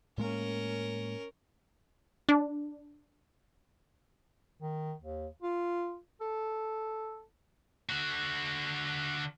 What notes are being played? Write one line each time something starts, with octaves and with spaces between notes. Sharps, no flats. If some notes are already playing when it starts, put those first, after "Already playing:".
A2 G#3 A#3 C#4 A#4
D4
D#3
D#2
F4
A4
D3 F#4